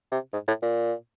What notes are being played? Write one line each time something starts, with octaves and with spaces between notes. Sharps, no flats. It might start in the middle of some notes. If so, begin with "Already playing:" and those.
C3
G#2
A2
A#2